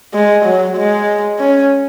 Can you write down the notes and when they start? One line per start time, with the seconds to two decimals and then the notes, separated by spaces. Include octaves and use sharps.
0.14 G#3
0.45 F#3
0.77 G#3
1.39 C#4